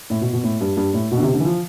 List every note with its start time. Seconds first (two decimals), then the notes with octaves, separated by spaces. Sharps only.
0.10 A2
0.21 B2
0.33 B2
0.44 A2
0.61 G2
0.77 G2
0.94 A2
1.11 B2
1.17 D3
1.23 C3
1.34 D3
1.40 E3
1.45 F3